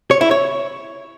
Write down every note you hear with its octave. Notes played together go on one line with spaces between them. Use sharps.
C#5
E4
C#5